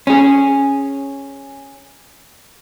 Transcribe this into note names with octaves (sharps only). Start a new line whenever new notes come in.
C#4 G#4